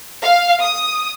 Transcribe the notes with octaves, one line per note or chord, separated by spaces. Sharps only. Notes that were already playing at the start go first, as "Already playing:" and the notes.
F5
D#6